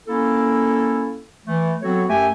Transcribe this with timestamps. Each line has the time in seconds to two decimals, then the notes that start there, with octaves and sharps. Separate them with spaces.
0.07 A#3 C#4 E4 A4
1.46 E3 A3
1.81 F#3 B3 C4 F#4 A4 C#5
2.08 F#2 A3 G4 E5 G5 G#5